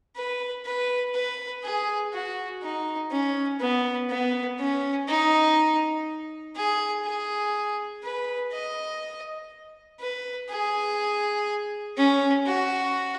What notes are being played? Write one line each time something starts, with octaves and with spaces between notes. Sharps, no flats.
B4
B4
B4
G#4
F#4
D#4
C#4
B3
B3
C#4
D#4
G#4
G#4
B4
D#5
B4
G#4
C#4
F#4